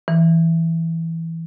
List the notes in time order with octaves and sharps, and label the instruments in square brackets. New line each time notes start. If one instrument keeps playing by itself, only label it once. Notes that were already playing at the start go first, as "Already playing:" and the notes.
[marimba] E3